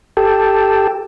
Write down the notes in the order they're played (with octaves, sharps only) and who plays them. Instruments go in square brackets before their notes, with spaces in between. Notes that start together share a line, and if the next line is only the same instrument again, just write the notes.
[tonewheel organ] G4 A4